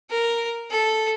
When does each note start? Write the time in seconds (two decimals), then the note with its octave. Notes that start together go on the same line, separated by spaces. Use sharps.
0.10 A#4
0.71 A4